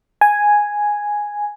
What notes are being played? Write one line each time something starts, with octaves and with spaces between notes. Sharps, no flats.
G#5